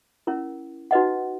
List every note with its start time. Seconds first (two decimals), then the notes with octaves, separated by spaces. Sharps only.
0.27 C#4 E4 A#4
0.91 D#4 F#4 B4 D#5 F#5